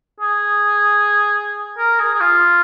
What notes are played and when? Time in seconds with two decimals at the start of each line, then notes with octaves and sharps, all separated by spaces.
0.21 G#4
1.78 A#4
2.00 G#4
2.14 G#4
2.20 F4